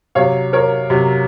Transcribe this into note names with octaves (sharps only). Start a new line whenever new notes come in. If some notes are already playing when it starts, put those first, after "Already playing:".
C3 F#3 C#5 F5
A#4 C#5
C3 F#3